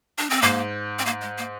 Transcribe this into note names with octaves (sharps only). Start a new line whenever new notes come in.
D4
C4
G#2 A#3
C4
A#3
G#3
A#3